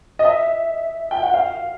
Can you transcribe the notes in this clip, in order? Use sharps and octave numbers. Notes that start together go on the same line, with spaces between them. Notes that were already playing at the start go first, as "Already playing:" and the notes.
D#5
E5
G5
F#5
F5